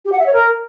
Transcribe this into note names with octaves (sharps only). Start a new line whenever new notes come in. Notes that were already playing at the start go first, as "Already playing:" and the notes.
G4
F#5
E5
C#5
A#4